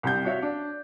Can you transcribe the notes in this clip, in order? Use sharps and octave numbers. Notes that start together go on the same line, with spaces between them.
C2 C3 G6
F#4 C#5 E5 F5
D4